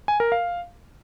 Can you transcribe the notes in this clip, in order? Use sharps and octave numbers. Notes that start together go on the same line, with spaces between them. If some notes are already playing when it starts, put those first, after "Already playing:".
G#5
A#4
F5